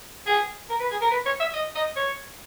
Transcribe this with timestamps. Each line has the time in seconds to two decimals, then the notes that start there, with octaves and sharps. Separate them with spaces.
0.27 G#4
0.70 A#4
0.80 B4
0.91 G#4
1.01 A#4
1.11 B4
1.26 C#5
1.40 E5
1.53 D#5
1.75 D#5
1.96 C#5